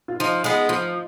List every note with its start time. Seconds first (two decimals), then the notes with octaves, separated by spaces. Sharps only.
0.08 F4
0.20 F3 D#4
0.44 G#3 B3
0.69 F3 F4